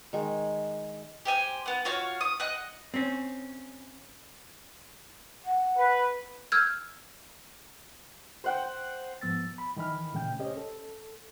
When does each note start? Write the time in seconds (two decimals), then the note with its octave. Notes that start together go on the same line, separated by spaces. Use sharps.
0.13 D#3 G#3
1.25 G4 C5 G#5
1.66 B3 F#5
1.85 F4 F#4 C#5 F5
2.21 D#6
2.40 D#5 F#5 F#6
2.94 C4 C#4
5.45 F#5
5.78 B4
6.52 E6 F6 G6 G#6
8.44 C5 F#5 G5
9.21 G#2 F3 B3 E6 A6
9.58 B5
9.77 D#3 E3 D#5 B5 F6
10.13 A#2 C#3 A3 C#4 G5 G6
10.39 C#4 G4 C5 C#5 D#5
10.57 A4